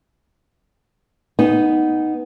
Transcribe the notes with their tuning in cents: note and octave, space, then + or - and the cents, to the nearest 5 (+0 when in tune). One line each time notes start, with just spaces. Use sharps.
B3 +0 D#4 +0 G#5 -40